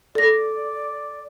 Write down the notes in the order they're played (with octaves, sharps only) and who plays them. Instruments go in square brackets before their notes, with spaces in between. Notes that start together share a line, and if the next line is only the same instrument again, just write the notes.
[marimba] A4 A#6 [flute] D5